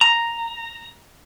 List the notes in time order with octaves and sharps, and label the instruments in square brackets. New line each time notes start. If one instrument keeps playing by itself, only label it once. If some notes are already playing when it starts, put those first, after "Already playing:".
[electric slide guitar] A#5